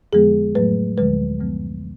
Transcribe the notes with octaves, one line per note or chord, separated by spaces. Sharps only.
F2 D3 F3 G#3 B3 G#4
A2 F#3 A3 B4
D2 D3 F3 G#3 B4
F#2 F3 G#3 B3